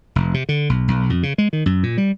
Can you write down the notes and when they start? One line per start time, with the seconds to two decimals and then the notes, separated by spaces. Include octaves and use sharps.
0.16 F1
0.34 C3
0.49 D3
0.69 B1
0.88 B1
1.10 F2
1.23 C#3
1.38 G#3
1.53 D#3
1.66 F#2
1.83 A#2
1.97 G3